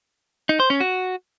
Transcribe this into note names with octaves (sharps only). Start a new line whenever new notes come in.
D#4
C5
C#4
F#4